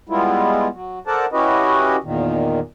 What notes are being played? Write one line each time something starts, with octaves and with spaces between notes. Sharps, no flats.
G3 G#3 B3 E4 F4
F#3
A4 A#4 C5 D5 F#5 A5
C#4 E4 F#4 G4 B4 D#5
E2 A#2 D#3